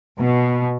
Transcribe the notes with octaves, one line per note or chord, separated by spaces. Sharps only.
B2